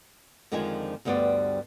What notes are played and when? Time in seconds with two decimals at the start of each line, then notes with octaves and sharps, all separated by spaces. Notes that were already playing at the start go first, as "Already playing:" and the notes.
0.52 F2 D3 D#3 F3 G#3 G#5
1.05 D2 G2 G3 B3 C5 D5